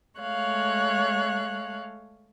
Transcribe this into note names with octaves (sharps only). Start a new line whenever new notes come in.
G#3 A3 C#5 F5 F#6